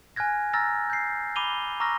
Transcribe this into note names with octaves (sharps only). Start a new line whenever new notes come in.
G#5 F6 F#6 G#6 A#6
A#5 E6 F6 A6 A#6
G6 C7
B5 D6 D#7 F7 G7
A#5 C#6 D6 E6 F6 A#6